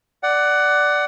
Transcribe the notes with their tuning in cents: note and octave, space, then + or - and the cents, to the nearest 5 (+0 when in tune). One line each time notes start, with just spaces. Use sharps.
D5 +0 F#5 +15